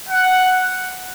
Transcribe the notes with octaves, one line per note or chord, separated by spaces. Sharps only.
F#5